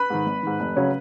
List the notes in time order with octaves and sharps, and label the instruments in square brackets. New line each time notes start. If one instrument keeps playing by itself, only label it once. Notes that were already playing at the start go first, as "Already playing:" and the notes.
Already playing: [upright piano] B4 B5
G#2 D#3
G#1
G#2 D#3
F1
C#3 F#3 C#4